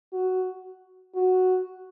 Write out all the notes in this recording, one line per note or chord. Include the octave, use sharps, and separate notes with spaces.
F#4
F#4